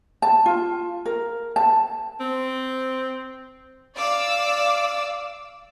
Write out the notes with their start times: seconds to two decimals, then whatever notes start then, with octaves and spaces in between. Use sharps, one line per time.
0.22 A5
0.46 F4
1.05 A#4
1.56 A5
2.20 C4
3.95 D5 F5 D6 E6